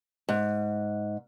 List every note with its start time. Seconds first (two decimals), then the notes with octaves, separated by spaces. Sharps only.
0.29 G#2